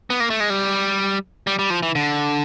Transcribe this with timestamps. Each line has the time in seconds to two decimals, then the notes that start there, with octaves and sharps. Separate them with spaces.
0.10 B3
0.20 A#3
0.30 A3
0.40 G#3
0.50 G3
1.47 G3
1.59 G3
1.70 F3
1.83 E3
1.95 D3